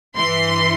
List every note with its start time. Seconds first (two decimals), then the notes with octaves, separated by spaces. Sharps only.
0.16 G2 E3 C6